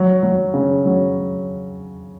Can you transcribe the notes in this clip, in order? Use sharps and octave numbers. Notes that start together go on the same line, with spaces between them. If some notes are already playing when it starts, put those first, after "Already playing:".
Already playing: F#3
F#3
C#3
F#3